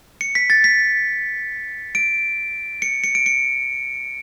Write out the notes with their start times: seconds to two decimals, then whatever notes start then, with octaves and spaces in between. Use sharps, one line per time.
0.21 C#7
0.35 B6
0.50 A6
0.64 B6
1.95 D7
2.82 C#7
3.04 C#7
3.15 D7
3.26 C#7